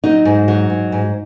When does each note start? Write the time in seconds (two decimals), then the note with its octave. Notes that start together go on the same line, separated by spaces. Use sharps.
0.04 F#3 D#4
0.25 G#2
0.48 F#3
0.70 G#2
0.92 G#2